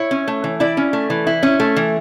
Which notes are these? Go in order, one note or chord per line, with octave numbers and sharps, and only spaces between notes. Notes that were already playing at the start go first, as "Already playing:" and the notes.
Already playing: E4 C#5
C#4
A3
E3
E4 D5
C#4
A3
E3
E4
C#4
A3
E3